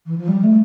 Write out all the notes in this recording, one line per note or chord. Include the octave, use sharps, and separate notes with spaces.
E3
F3
G3
A3